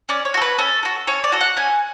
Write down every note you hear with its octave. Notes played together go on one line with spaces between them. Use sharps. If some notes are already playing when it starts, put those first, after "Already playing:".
C#4 D5
C#5
F#4 A4
B4
C#4 A4
F#4 A4
C#4 C#5
D5
F#4 A4
F#5
C#4 G#5